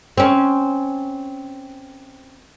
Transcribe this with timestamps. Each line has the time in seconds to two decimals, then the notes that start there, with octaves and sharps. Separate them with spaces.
0.18 C4 C#4